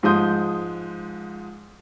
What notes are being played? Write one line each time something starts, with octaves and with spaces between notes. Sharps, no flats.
G#2 F3 G#3 C6 D#6 G6